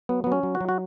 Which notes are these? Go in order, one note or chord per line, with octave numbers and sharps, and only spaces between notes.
F#3 B3
F#3 B3
C#4
F#3
F#4
F#3
F#4